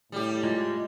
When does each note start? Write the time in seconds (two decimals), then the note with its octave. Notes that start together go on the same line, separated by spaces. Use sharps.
0.12 A2 G3 G4
0.43 G#3 F4